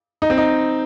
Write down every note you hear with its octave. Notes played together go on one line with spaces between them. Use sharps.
D#4
C4
D#4